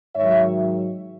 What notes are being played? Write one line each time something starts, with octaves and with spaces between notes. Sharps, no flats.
G#2 D#3 F#3 C#5 E5